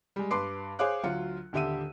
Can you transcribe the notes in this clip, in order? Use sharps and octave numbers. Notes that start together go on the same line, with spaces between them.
G3 G#3
G2 B4 C6 D6 C7
G#4 C5 C#5 F5 D6 F#6
D2 F#3 F4 C#7
D#1 D3 G4 E5 E6 D#7